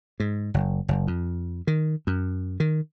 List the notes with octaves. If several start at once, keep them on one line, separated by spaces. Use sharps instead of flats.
G#2
F#1
F#1
F2
D#3
F#2
D#3